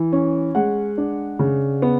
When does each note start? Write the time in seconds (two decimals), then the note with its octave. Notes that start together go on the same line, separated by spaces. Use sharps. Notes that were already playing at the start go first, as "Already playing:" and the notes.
Already playing: E3
0.13 C#4
0.55 G#3 F#5
0.98 D4
1.39 C#3
1.82 B3